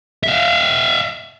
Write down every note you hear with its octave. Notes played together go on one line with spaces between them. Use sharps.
E5 F5